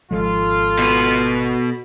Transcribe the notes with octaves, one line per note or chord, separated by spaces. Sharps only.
G#1 F3 G#3 F4 A4
B2 B4